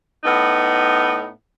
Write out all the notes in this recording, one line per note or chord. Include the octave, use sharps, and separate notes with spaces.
A2 B3 D#4